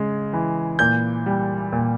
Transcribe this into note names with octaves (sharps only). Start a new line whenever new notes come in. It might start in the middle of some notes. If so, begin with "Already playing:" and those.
Already playing: C#3 G#3
E3
A#2 G6
G3
A#2